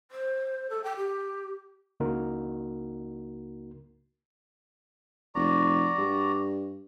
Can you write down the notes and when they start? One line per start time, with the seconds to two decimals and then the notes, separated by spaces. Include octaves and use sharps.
0.11 C5
0.70 A4
0.84 G5
0.97 G4
2.00 C#2 C#3 A#3 D#4 F#4 A#4
5.35 F1 F#4 D5 A#5
5.98 G2